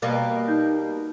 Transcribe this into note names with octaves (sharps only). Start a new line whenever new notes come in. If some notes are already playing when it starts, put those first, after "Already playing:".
B2 G3 A#3
D#4 G6